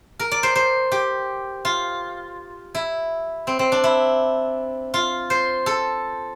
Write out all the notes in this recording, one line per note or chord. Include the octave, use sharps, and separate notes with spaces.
A#4
D5
C5
C5
G4
F4
E4
C4
C4
D4
E4
F4
C5
A4